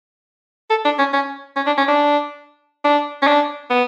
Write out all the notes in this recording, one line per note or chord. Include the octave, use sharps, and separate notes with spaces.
A4
D4
C#4
C#4
C#4
D4
C#4
D4
D4
C#4
D4
B3